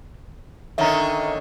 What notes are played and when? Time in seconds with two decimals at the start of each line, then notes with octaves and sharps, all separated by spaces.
0.78 D3 D#3 C#4 E5 A#5